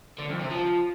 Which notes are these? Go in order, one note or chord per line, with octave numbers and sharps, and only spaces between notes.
D3
F2
C3
F3